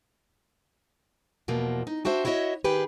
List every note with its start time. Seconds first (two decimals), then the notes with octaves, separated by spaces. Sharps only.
1.48 E2 B2 F3 A#3
1.87 D#4
2.05 D4 F#4 G4 C5 E5
2.25 E4 F#4 C#5 D#5 E5
2.64 D#3 G4 G#4 B4